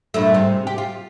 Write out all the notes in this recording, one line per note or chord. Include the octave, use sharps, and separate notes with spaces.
G2 A#2 A3
G#2 C3
G4
F4